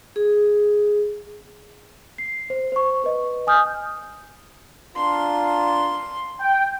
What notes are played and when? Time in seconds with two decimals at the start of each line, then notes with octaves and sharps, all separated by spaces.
0.16 G#4
2.18 C7
2.50 C5
2.72 C5 C#6
3.04 B4 D#5
3.47 G#5 D#6 F6 G6
4.96 D4 F4 A#4 C6
6.40 G5